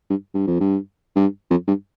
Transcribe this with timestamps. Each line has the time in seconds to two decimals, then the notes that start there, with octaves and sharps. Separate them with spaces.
0.10 G2
0.34 G2
0.47 F2
0.60 G2
1.16 G2
1.50 F2
1.68 G2